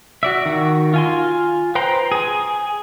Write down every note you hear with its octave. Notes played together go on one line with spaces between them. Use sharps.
F#4 D5 E5
D#3 F#4
F4 G#5 C6
B4 C5 G5 A#5 C6
G#4 G#5